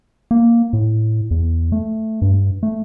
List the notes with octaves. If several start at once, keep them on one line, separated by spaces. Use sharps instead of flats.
A#3
A2
E2
A3
G2
A3